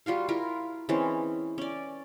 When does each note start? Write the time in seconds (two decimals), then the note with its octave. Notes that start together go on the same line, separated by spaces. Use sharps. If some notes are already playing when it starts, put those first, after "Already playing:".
0.06 G3 F4 F#4 F5
0.28 E4 F4 A#4
0.89 E3 G#3 C4 C#4
1.58 C#4 D5